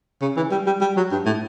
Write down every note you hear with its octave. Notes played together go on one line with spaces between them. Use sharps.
C#3
E3
G3
G3
G3
F#3
G2
A2